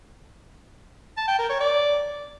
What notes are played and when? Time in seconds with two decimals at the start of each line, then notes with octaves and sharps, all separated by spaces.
1.17 A5
1.28 G5
1.39 A#4
1.49 C#5
1.60 D5